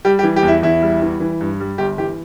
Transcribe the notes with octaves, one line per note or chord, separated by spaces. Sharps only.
G3 G4
G4
E3
G4
E2
E4
E2 E4
G3
E3
E3
G2
G3
G1 G4
E3 G4